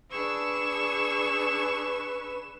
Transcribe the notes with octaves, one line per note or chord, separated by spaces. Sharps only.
D4 G#4 B4 C#6 E6 E7